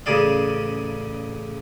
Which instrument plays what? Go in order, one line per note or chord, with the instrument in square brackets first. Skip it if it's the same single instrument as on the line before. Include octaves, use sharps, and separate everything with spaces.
[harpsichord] A1 C#3 G#4 D5 F5